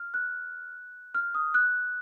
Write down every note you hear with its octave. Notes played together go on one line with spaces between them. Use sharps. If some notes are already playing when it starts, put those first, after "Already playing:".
Already playing: F6
F#6
F6
D#6
F#6